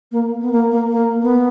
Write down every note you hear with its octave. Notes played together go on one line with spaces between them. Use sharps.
A#3
B3
A#3
A#3
A#3
B3